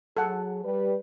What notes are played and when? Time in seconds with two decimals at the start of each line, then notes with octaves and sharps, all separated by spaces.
0.17 F#3 G#4 A4 F#5
0.64 G3 B4